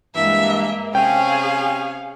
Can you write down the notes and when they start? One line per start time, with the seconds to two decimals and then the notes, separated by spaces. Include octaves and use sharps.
0.15 G2 E3 G#3 A#3 E5
0.95 C3 C#4 G#4 F5 G5